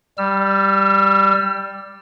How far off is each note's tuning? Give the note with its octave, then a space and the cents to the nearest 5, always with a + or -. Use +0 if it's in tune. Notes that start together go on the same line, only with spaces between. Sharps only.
G3 +0 E6 +40